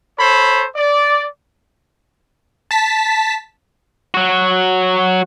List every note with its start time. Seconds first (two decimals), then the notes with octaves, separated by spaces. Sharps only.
0.18 A4 C5 C#5 B5
0.75 D5
2.71 A5 B6
4.14 F#3 F#4